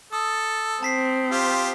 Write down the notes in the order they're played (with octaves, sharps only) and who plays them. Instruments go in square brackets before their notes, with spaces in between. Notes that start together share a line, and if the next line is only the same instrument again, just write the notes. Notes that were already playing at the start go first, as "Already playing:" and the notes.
[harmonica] A4 [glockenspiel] D#6
[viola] C4 [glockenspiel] A5 B6 C7
[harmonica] F4 G4 C5